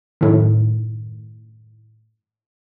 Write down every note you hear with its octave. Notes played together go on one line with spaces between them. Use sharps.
F#2 A2 D#3